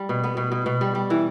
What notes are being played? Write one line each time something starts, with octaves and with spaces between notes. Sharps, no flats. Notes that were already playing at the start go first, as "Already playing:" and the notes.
Already playing: G3
B2
B3
B2
B2
B2
G3
G3
E3